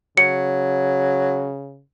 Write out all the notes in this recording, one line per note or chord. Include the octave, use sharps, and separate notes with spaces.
C#3 F#3 C#7